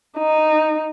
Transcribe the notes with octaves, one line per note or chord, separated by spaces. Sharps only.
D#4